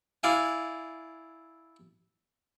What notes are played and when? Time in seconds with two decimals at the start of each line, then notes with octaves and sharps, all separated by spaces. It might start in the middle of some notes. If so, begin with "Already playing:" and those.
0.23 E4 D5 F5 G#5